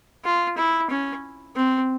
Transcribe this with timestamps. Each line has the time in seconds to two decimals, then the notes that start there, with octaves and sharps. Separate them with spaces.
0.25 F4
0.57 E4
0.90 C#4
1.56 C4